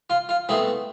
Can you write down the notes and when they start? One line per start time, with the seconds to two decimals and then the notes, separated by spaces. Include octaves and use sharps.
0.10 F4
0.29 F4
0.49 B2 A3 C4 E4 G#4